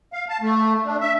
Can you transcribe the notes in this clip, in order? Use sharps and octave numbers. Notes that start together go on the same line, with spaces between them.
F5
A5
A3
D4
E5